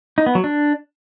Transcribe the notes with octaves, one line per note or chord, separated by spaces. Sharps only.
D#4
B3
F#3
D4